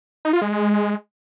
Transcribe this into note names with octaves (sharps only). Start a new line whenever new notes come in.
D#4
F4
G#3